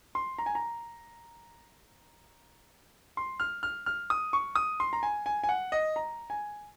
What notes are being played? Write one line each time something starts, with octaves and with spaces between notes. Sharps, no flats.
C6
A#5
G#5
A#5
C6
F6
F6
F6
D#6
C#6
D#6
C6
A#5
G#5
G#5
G#5
F#5
D#5
A#5
G#5